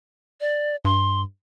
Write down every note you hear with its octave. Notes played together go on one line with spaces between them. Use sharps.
D5
G2 C6